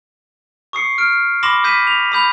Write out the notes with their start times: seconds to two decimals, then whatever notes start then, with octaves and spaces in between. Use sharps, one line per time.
0.73 C#6 D#6 C7 C#7
0.98 F6 D7
1.43 B5 C6 D6 A#6 E7 F#7
1.64 D#6 G6 B6 D#7 E7
1.87 F7
2.12 B5 D#6 G6 F7